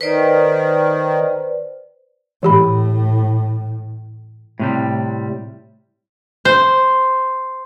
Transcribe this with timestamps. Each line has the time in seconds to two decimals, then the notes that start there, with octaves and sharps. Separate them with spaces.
0.01 D#3 B4 C5 D5
2.43 A2 E3 G4 B5
4.59 A2 C3 G3
6.45 C5